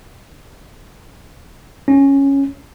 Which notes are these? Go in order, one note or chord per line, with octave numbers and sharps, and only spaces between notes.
C#4